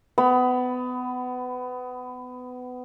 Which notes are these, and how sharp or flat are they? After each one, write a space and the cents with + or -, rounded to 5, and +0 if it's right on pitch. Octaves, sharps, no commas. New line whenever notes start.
B3 +25 B5 +10